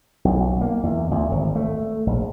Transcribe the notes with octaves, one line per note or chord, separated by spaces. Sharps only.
B1
A#3
E2
D2
G#1
A3
A#1